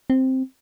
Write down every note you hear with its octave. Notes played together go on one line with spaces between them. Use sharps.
C4